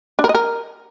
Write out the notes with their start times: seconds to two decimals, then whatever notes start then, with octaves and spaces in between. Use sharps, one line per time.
0.19 D4
0.24 A#4
0.29 D#5
0.35 A#4